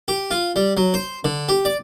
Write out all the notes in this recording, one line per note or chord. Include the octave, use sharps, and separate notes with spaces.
G4
F4
G3
F#3
C5
D3
G4
D5